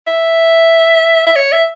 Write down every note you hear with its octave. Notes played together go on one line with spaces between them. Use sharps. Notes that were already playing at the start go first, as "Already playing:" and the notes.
E5
E5
C#5
E5